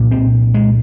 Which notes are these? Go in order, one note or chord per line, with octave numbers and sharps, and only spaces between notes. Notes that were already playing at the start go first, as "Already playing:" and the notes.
Already playing: C2 A#2
C4
G#3